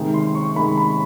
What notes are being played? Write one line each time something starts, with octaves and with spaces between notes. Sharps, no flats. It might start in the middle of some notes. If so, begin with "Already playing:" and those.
Already playing: C3 D#3 G#3
C6
C#6
C3 D#3 G#3 B5
B5